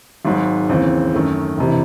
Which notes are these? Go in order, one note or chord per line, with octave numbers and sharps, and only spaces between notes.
G#1 G#2 F#3
D#2 C#3 E3 C4
F#2 D#3 A3
E1 C3 E3